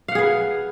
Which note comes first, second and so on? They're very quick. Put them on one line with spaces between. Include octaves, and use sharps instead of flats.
F5 F#5 G#4 B4